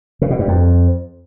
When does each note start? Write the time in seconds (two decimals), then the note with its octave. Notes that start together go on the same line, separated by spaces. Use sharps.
0.22 C#3
0.30 B2
0.39 G2
0.48 F2